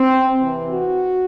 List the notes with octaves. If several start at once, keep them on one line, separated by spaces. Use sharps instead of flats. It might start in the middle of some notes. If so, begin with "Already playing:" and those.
Already playing: C4
C3 E3
F#4